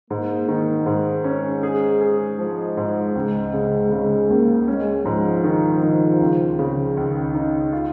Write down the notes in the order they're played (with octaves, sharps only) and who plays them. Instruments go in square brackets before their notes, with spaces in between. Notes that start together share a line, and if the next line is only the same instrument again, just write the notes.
[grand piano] G#2 [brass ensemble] A#3
[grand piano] D#3
[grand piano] G#2 [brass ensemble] G#3
[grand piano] C#4
G#4
G#4
[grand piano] F3 [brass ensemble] G#3
[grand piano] G#2
[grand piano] C#2 [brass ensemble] G#3
[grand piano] C#3
[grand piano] C#3 [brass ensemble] G#3
[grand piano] C#2 [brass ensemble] A#3
[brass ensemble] G#3 [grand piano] C#4
[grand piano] G#2 [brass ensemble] F3
[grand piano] D#3
D#3
C#2
C#3
[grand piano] C#2 [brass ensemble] D#3
[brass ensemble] C#3 [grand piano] D#4
[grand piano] F4